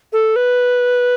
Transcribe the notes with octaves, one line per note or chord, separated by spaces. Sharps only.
A4
B4